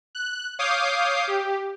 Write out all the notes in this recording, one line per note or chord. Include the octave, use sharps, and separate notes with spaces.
F#6
C#5 F5 D6 D#6 G6 C7
G4